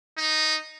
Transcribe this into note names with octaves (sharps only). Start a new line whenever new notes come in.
D#4